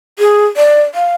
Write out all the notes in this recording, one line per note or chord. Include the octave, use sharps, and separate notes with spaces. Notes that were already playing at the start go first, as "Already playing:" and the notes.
G#4
D5
F5